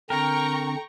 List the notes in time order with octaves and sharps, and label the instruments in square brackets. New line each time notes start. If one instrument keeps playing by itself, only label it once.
[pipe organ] D3 C4 D4 [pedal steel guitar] A#4 [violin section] G5 A#5 C#6